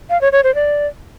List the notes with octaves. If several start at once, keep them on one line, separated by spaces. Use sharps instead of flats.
F5
C#5
C#5
C5
D5